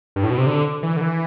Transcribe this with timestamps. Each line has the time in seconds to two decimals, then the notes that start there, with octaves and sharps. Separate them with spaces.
0.16 G2
0.23 A2
0.30 B2
0.38 C3
0.47 D3
0.83 E3
0.97 D3
1.01 E3